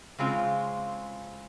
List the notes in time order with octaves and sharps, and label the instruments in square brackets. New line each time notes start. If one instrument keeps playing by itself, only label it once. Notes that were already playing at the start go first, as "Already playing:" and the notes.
[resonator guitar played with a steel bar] C#3 G#3 C4 F4